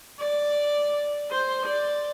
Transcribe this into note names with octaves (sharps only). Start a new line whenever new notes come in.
D5
C5
D5